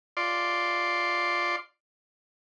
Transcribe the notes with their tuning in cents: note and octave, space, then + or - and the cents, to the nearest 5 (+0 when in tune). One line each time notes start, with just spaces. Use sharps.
F4 +0 D5 +0 C6 +0